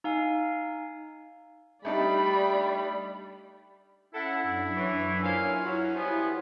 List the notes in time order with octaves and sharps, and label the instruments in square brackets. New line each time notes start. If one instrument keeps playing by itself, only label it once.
[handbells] D#4 F5 G#5
[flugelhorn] G3 [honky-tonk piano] A3 D4 D#4 [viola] D5 B5
[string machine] C#4 [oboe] E4 [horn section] A4 F#5
[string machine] F#2 D4 [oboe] E4
[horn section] E3 C#5
[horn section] A#2 C5 F5 [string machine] E4 C#5 [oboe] G#5
[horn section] F#3 C#4
[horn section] F3 G3 B3 [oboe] G#5